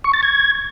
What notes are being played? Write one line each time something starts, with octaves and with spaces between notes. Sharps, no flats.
C#6
A6
G#6